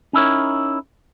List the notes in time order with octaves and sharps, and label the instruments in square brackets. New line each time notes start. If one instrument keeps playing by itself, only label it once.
[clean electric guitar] C#4 D#4 E4 A#4 C#5